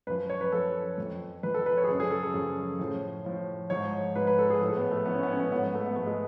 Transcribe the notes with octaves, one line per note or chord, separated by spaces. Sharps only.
F#2 F3 B4
C#5
B4
F#2 F3 A4
F2 F3
F2 F3 B4
A4
B4
C#5
G#4
F#2 C#3 F3 A4
G#4
A4
A4
F#2 C#3 F3
A2 F3
A2 F3
G#2 F3 C#5
G#2 F3 B4
B4
A4
G#4
A2 F3 A4
B3
A3
A2 F3 B3
C#4
B3
C#4
B3
G#2 F3 B3
B3
A3
B3
G#2 F3 A3
G#3